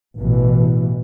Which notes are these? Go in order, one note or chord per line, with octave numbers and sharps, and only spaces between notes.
A1 B2 E3